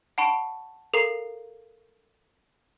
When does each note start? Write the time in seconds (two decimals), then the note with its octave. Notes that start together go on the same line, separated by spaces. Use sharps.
0.18 F#5 A5 B5 C#6 D7 E7
0.94 A4 A#4 F5 A#5 C7